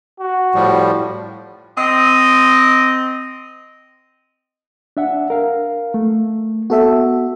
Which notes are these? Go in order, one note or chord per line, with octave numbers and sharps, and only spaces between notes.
F#4
A2 F3 G3
C4 D#5
D4 E5 F#5
A#4 F5
A3
B3 F#4 A4 E5